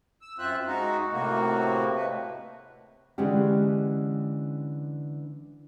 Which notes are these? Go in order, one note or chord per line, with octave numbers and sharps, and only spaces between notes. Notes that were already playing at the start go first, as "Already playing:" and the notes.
E6
F#2 C4 F4 C5 E5 F#6
G#3 D#4 F#4
A2 C3 A#3 F#4
G#3 A3 B4
D3 E3 G#3 C#4 G4